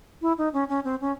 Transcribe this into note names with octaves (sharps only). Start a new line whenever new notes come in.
E4
D#4
C#4
C#4
C4
C#4